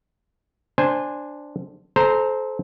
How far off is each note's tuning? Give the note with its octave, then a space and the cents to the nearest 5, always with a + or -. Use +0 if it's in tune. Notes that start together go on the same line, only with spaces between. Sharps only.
D4 +0 C5 +0 G#5 -15
A4 -30 C5 -5 A#5 -10